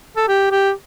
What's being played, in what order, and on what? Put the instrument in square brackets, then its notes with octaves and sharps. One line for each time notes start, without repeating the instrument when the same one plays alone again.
[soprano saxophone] A4
G4
G4